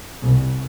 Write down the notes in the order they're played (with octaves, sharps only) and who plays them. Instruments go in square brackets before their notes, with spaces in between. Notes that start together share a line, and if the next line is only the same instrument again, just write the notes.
[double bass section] C2